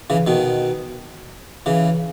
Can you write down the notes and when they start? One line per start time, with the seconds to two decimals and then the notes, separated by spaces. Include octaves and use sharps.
0.10 C#3 E3
0.27 B2 D#3
1.66 C#3 E3